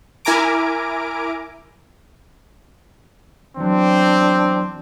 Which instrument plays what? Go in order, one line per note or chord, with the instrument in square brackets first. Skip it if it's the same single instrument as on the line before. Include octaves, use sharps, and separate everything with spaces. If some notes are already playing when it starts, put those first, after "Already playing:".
[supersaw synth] E4 A#4 G#5 A#5 D6 D7
[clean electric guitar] E2 F#3 [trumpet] C4 [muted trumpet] D4